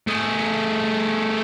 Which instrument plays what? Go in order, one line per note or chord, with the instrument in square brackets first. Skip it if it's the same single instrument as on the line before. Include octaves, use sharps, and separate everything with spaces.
[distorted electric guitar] A3 G#4